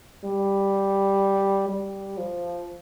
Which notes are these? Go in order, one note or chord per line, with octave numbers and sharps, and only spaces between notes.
G3
G3
F3